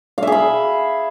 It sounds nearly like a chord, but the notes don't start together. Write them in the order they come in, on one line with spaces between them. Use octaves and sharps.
F5 E5 G#4 B5